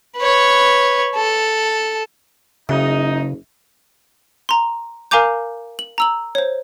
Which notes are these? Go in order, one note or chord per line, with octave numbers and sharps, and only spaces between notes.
B4 C#5
A4
F#1 F#2 C#3 D#4
A#5 C6
A#4 F5 G#5 A#5 D6 G6
F#7
A#5 E6 F#7
C5 C#5